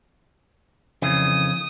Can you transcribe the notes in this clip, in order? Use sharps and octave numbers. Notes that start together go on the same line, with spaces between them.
F2 C#3 E3 D#6